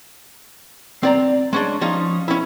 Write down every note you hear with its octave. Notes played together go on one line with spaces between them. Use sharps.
C4 D5 A#5
G#3 C#4 D4
F3 C#4 D#4
C#4 E4